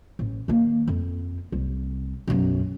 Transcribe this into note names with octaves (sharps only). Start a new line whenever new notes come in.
A1
D#3 A#3
F2
C2
B1 F#2